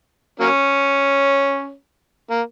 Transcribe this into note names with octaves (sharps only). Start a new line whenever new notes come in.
F#3 A#3 C#4
A#3